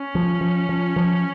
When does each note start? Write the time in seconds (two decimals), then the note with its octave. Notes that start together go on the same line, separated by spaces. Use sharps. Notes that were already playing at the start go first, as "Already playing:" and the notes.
Already playing: C#4
0.15 F3
0.41 F3
0.69 F3
0.96 F3